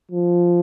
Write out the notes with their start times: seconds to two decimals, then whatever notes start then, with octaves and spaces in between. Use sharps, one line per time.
0.11 F3